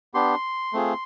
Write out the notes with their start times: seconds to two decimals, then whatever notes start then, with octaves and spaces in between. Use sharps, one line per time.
0.14 B3 D4 G4 C6
0.73 A3 C4 F4 G#4